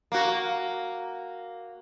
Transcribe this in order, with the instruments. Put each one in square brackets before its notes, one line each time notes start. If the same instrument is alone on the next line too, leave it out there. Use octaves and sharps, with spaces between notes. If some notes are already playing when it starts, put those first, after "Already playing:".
[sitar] A#3 F#4